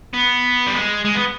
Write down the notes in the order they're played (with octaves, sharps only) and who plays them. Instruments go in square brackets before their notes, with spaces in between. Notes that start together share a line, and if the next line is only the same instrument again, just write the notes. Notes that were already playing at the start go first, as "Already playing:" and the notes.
[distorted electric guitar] B3
G3
G#3
G#3
B3